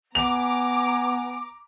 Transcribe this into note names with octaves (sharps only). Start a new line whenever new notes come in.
B3 G#5 A#5 D6 F7